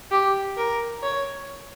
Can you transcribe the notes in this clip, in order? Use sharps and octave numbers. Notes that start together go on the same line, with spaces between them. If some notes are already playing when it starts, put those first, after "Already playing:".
G4
A#4
C#5